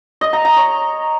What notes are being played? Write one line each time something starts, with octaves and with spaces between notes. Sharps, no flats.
D#5
A#5
A#5
C#5